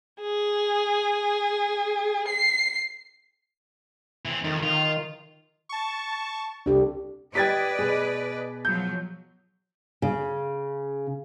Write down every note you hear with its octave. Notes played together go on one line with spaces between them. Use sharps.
G#4
C7
E3 C4
F2 D#3
D#3 F4
A5 C#6
C2 D4 G4 A4
G4 B4 D5 D#5 G5 G#6 A6 B6
B2 G#4
F3 F#3 G6
C#3